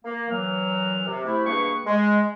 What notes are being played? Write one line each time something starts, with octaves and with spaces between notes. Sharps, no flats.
A#3
A#2 E3 F#3 F6
C3
C3 A3 E4
G2 B2 A#3 G#4 B4 C#6
G#3